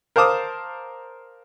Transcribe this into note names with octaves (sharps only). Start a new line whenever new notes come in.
A#4 C5 F5 A5 D6 D#6